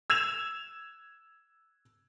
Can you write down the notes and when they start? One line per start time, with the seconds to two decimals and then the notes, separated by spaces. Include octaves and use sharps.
0.10 E6 G#6 E7 F7